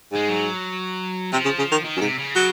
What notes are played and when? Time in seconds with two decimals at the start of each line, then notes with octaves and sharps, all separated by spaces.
0.12 G#2 G#3
0.28 F#3
1.33 C3 F3
1.45 C#3
1.59 C#3
1.72 D#3
1.84 D#3
1.97 F#2
2.01 G#2 C3
2.19 C#3
2.35 F#3